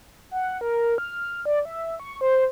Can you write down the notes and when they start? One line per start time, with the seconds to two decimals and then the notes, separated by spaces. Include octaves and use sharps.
0.31 F#5
0.61 A#4
0.98 F6
1.46 D5
1.65 E5
2.00 C#6
2.21 C5